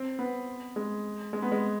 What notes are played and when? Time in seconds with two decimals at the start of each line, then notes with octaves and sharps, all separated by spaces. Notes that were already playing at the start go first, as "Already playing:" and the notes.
Already playing: C4
0.19 B3
0.76 G#3
1.33 G#3
1.42 B3
1.52 G#3